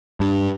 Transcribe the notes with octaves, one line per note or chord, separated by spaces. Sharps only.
G2